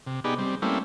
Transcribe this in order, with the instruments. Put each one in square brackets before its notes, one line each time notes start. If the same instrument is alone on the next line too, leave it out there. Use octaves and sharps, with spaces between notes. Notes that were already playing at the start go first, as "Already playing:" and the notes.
[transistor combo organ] C3
B3 D#4 G4 G#4 D5 B5
G3 C4
G3 A3 A#3 C4 C#4 E4